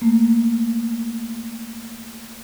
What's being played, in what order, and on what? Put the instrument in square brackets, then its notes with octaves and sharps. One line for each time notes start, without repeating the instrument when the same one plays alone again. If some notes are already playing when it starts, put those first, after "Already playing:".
[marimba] A3 A#3